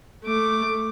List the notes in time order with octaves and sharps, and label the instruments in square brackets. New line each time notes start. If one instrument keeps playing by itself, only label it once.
[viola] A3 D6